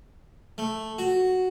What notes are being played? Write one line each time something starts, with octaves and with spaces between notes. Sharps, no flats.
A3
F#4